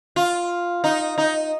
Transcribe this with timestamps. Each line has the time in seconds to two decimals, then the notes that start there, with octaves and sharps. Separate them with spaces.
0.16 F4
0.84 D#4
1.18 D#4